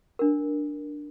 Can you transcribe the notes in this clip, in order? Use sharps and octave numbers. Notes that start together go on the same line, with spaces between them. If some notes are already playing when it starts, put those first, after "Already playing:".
D4 A#4